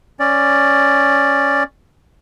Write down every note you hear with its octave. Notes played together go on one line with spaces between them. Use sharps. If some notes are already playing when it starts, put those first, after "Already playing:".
C#4 D5